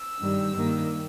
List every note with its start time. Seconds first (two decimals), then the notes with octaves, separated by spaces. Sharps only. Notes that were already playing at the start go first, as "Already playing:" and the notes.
Already playing: E6
0.21 G2 D#3 G3
0.55 G2 D#3 A#3